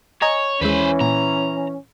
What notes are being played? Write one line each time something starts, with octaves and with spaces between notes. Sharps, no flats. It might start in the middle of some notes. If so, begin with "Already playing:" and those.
C#5 D#5 G#5 A#5
D#2 E3 G#3 C#4 B4 C5
A#2 A#5